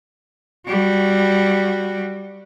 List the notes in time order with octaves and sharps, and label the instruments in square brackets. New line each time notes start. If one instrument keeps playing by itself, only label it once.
[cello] G3 F#4